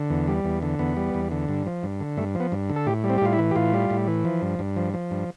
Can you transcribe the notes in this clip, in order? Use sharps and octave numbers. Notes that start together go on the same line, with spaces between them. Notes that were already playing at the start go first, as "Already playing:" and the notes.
Already playing: D3
E2
G3
E2
D3
E2 B3
G3
E2
D3
G2
F3
G2
D3
G2 A3
F3
B3
G2
D3
A4
A2 G4
G3
C4
G4
A2 F4
E4
E3
G4
A2 F4
G3
A2
E3
F3
G2
G2
F3
F3
G2